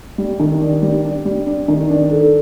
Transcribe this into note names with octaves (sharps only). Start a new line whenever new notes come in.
G3
D#3
D4
G3
D4
G3
D4
D#3
D4
A4